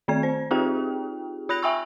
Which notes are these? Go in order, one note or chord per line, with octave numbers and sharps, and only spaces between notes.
D#3 A3 C4 D5 G#6
C5
C4 D#4 F4 G4 G#4 G5
F4 B5 F#6 A#6 F7
E5 G5 G#5 B5 C#6 E6